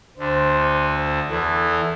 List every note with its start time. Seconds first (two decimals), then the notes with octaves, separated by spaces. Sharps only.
0.18 D2 D3 C5
1.30 E2 E3 A4